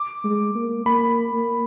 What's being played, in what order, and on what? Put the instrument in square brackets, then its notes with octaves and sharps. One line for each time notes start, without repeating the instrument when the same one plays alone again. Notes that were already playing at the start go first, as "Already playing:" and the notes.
Already playing: [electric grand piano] D6
[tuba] G#3
A#3
[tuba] A#3 [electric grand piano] B5
[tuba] A#3